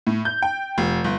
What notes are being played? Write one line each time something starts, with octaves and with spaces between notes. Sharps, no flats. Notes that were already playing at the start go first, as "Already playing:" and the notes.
A2
G6
G5
F1
G1